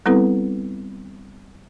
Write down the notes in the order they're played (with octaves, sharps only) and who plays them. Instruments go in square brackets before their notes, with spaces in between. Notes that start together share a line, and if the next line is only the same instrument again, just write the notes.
[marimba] G3 B3 C4 E4 A4 B4